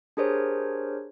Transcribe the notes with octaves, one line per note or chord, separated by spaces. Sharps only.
D4 G4 G#4 A#4 C5 C#5